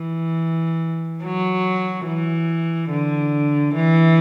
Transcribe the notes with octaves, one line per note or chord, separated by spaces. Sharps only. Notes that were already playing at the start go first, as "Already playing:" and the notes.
Already playing: E3
F#3
E3
D3
E3